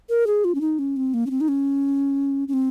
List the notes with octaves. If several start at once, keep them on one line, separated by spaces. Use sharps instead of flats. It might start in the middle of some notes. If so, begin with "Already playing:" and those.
A#4
G#4
F4
C#4
D#4
C#4
C4
A#3
C#4
C4
D#4
C#4
C#4
C4